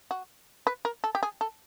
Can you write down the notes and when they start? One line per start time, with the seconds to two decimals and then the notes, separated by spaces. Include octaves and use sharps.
0.11 F#4
0.67 B4
0.85 A#4
1.04 A4
1.15 G4
1.23 G#4
1.41 A4